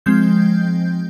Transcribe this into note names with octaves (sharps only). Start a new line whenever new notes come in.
F3 G#3 C4 G6